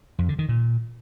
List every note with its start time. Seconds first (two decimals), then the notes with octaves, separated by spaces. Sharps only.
0.19 F2
0.29 D3
0.39 D#3
0.49 A#2